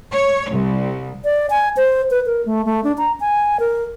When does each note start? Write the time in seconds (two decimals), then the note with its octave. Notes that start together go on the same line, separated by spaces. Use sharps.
0.12 C#5
0.51 C2
1.24 D5
1.50 G#5
1.77 C5
2.11 B4
2.26 A#4
2.46 A3
2.65 A3
2.84 D4
2.98 A#5
3.20 G#5
3.60 A#4